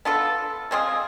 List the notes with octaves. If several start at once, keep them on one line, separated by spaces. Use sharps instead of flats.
B3 D4 F4 A4
G#3 C4 F4 G#4